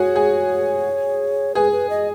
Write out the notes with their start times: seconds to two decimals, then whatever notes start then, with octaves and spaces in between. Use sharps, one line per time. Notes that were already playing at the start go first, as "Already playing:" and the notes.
Already playing: F#4 G#4 C#5
0.16 G#4
1.55 G#4 B4
1.72 B4
1.90 D#5